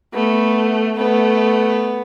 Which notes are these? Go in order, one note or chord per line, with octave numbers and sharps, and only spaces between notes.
A3 B3
A3 B3